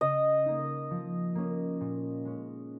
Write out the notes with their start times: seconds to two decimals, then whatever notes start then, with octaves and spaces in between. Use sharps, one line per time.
0.01 C#3 D#5
0.46 A#3 D#4
0.91 F3
1.35 A#3 C#4
1.81 A#2
2.25 G#3 C#4